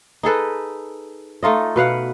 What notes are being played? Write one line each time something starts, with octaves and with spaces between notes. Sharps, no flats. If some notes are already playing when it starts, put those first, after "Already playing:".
D#4 G#4 A4 B4
A3 D#4 F4 D#5
B2 B4 F5 F#5